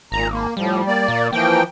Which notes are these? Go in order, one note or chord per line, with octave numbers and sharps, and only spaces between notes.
G#1 A#2 A#5
A#3
A2 F3 G3
A#3 D5
A#2
E3 F3 A#3 G5